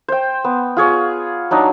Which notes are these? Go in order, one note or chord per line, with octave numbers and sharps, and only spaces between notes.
C5 G5
B3
F4 G#4 C#5
F#3 D4 D#4